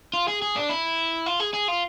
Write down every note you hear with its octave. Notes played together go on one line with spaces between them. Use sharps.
F4
G#4
G#4
D4
E4
F4
G#4
G#4
F4